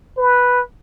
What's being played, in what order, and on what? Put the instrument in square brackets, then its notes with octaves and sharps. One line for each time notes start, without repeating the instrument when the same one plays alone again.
[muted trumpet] B4